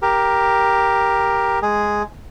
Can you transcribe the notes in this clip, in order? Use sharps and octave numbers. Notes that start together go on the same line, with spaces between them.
G4 A#4
G#3 G#4